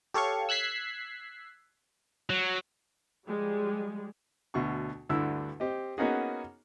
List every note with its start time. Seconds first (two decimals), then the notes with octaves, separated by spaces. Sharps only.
0.14 G4 A4 C#5 F5 C#6
0.49 E6 F#6 G#6 B6 C7
2.30 F#3
3.26 F3 G3 G#3
4.54 D2 B2 C#6
5.10 D2 G2 D3 E4 E6
5.60 C4 G4 D#5
5.98 A#3 B3 C#4 D#4 F#4 G#4